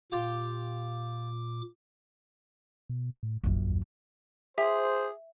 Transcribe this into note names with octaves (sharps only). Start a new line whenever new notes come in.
A#2 F4 G4 G5 D6
B2
A2
D#1 A#1 F#2
D#2
G#4 C5 E5